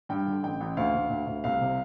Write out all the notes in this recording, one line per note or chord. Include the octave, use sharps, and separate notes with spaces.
G2 G5
D3
A1 G5
A1
D2 F5
D2
D2
D2
C2 F5
C3